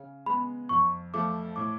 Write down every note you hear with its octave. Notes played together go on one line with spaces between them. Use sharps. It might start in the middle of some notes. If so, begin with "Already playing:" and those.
Already playing: C#3
G#3 B3 B5
F2 C#6
F3 A3 D6
A2 D6